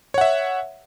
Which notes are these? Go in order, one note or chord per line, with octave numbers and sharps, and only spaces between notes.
C#5 E5 F#5